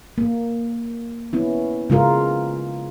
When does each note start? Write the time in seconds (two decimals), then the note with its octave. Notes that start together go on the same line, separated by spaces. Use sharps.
0.18 A#3
1.33 B3 C#4 E4
1.90 C#3 G#3 F4 A#4